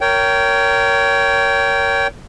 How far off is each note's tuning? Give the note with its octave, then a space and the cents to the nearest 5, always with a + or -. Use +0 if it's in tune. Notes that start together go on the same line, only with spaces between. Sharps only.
A#4 -10 C#5 +20 G5 -10